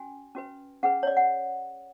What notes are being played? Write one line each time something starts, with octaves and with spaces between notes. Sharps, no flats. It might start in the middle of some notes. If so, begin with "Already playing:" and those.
Already playing: C#4 F#4 G#5
C#4 F#4 B4
C#4 G#4 B4 F#5
C#5
D5
F#5